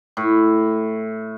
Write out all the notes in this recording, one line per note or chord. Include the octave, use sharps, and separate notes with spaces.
A2